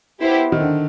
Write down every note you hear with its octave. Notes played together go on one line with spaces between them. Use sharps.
B3 E4 G4 C5
D#3
D3